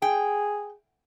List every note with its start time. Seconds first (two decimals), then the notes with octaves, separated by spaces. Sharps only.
0.02 G#4 G5